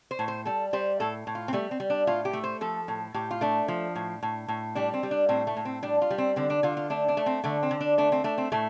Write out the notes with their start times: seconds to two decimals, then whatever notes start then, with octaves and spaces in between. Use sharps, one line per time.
0.11 C5
0.19 A2
0.28 C5
0.45 G3 A4
0.73 G3 C5
1.00 A2 A4
1.27 A2
1.35 F4
1.48 C4
1.53 G3 A3
1.71 C4
1.80 G3
1.90 D4
2.07 A2 F4
2.25 G4
2.33 A3
2.44 C5
2.61 F3 A4
2.88 A2
3.14 A2 G4
3.31 F4
3.41 A3 D4
3.68 F3
3.95 A2
4.23 A2
4.48 A2
4.75 G3 D4
4.94 C4
5.03 G3
5.11 D4
5.29 A2 C4
5.47 A3
5.57 A2
5.65 C4
5.83 G3 D4
6.02 F4
6.10 G3
6.18 C4
6.36 D3 C4
6.50 D4
6.63 D3 F4
6.77 F4
6.90 A3 D4
7.08 D4
7.17 A3
7.26 C4
7.44 D3 A3
7.63 C4
7.71 D3
7.81 D4
7.98 A3 D4
8.12 C4
8.24 A3 D4
8.38 C4
8.52 A2 A3